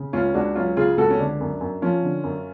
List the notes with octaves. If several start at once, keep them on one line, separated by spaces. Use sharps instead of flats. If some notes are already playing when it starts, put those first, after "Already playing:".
Already playing: C#3
C#2 C#4 F4
C#2 D4 F#4
F#3 C#4 F4
C#3 F4 G#4
C#2 F#4 A4
C#4
D3 D4
F#2
F#2
F3 C#4 F4
D3
F#2